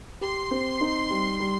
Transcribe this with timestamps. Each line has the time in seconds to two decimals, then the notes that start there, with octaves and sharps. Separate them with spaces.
0.21 G4 C6
0.51 C4
0.81 D#4
1.11 G3
1.40 G3